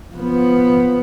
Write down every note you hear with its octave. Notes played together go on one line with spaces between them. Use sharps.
F3 B3